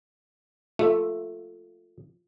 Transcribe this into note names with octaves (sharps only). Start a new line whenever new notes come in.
A3 F4 E5